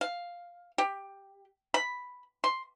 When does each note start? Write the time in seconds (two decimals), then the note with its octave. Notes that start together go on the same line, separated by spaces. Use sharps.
0.01 F5
0.78 G4
1.74 B5
2.44 C6